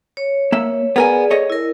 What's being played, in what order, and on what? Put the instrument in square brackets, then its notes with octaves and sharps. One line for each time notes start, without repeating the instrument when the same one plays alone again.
[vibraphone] C#5
[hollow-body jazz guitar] A#3 E5
[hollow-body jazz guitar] B3 A#4 G#5 [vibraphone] G#4 D5
[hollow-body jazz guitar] A4 C#5 D#5
[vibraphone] E4 A#4